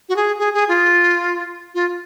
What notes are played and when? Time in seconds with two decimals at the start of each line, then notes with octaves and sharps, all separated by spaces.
0.09 F#4
0.16 G#4
0.39 G#4
0.54 G#4
0.69 F4
1.75 F4